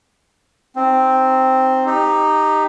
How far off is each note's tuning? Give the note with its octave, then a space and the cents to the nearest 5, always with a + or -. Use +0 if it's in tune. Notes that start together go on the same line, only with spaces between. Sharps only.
C4 +0 D#4 -5
D#4 -5 G4 +15